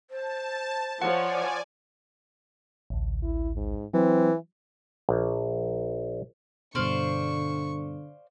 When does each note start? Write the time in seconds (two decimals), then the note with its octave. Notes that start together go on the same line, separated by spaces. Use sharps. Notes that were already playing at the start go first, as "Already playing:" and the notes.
0.10 C5 A5
1.02 F3 C#5 D5 F#5 G#5
2.90 A1 D2
3.23 E4
3.55 G#2
3.94 E3 F#3 C4
5.09 A#1
6.75 G2 B2 D3 C5 D5 F5 C#6